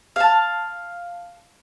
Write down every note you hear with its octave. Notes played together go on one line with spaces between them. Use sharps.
F5 A5